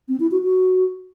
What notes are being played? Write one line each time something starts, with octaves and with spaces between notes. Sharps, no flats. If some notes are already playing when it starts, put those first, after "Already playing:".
C4
E4
F#4
F#4